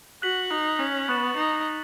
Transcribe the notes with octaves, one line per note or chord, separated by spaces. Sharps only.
F#4 F#6 B6 F#7
D#4
C#4
B3 C#6 F#6 A6 C#7 E7
D#4